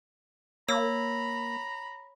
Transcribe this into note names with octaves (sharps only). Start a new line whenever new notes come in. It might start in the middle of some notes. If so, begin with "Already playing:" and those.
A#3 C#5 A#5 B5 E6